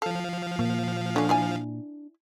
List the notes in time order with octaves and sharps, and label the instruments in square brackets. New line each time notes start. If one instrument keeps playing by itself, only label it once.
[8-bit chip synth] F3 F5 [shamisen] A4
[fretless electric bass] A#2 [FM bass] A#3
[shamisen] D3 C#4 [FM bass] D4
[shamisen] E4 D5 G#5